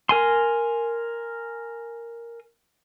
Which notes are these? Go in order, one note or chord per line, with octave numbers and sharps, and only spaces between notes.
A#4 G#5 C6